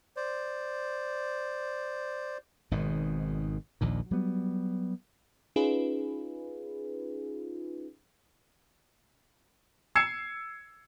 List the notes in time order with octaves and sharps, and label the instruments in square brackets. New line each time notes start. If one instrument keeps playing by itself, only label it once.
[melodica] C5 D5
[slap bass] G#1 G#2 B2 D#3
A#1 D#2 A#2
F#3 G3 B3
[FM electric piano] C#4 D#4 F4 G#4 B4
[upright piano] E6 G#6 C7 C#7 E7